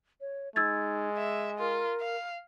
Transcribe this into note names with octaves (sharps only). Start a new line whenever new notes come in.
C#5
G#3 D#4 E6 G#6 A6
E5 G#5
F4 A#4
F5